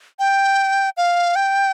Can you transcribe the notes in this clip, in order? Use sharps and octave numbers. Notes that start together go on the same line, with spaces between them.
G5
F5
G5